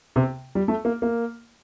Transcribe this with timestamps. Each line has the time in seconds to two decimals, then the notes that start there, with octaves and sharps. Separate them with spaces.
0.16 C3
0.55 G3
0.68 A3
0.85 A#3
1.02 A#3